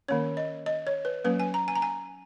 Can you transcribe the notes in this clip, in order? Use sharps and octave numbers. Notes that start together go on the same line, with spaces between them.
D#3 A#3 C#4 C#5
D#5
D#5
C#5
B4
F#3 A#3 C#4 B4
G#5
A#5
G#5
A#5
G#5